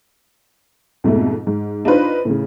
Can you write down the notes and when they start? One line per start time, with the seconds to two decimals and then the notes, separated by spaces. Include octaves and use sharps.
1.04 F2 G#2 B2 A3
1.47 G#2
1.85 D4 D#4 F4 B4 C5
2.25 A2 C#3